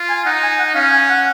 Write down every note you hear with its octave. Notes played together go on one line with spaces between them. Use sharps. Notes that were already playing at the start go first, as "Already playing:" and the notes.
Already playing: F4
G#5
D#4 F#5
G#5
F#5
C#4 F5
G#5
F#5